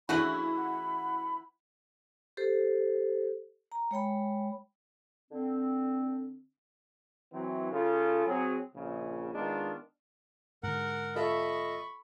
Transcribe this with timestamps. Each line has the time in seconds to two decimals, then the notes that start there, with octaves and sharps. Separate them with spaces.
0.09 C#3 E3 A3 D4 E4 F#4 B5 F#7
0.57 F#5
2.37 G4 A4 C5
3.72 A#5
3.91 G#3 C#5 G5 B5
5.31 D3 C4
7.33 E3 F#3 C4
7.72 C#3 F4 A4
8.27 F#3 C4 G#4
8.75 A#1 C#3
9.34 D#3 G#3 B3 D4 D#4 F4
10.63 G#2 D3 A#4 F#5
11.15 F4 A4 D#5 E5 B5 C#6